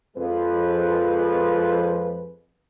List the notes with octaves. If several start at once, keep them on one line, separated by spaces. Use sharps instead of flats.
F2 F3 G#3 B4